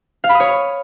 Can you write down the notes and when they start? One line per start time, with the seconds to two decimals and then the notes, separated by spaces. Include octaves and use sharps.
0.24 F5
0.29 B5
0.35 D#6
0.40 C#5